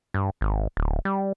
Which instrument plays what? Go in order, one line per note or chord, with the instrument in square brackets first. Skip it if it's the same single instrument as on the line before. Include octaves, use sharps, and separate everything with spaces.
[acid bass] G2
G#1
D1
G3